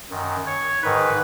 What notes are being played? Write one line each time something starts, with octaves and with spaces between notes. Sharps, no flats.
F#2 D#3
C#5
G#2 D#3 B4